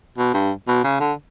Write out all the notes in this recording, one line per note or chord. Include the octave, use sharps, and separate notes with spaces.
B2
G2
B2
C#3
D3